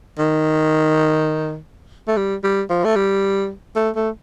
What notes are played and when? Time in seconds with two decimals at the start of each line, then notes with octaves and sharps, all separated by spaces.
0.18 D#3
2.08 A3
2.17 G3
2.44 G3
2.70 F3
2.84 A3
2.96 G3
3.76 A3
3.96 A3